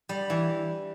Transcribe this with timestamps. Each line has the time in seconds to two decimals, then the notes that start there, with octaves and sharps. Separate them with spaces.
0.09 G3
0.30 E3